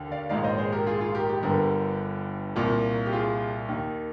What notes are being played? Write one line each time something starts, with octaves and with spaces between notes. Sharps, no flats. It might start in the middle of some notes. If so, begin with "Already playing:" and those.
Already playing: D#2 D3
D5 F5
A#1 G#2 D#3 D5 F5
C5 D#5
G#4 C5
G4 A#4
F4 G#4
F4 G#4
G4 A#4
G4
G1 G2 D3 G4 A#4
C2 A#2
G4
F4 G#4
D#2 D#3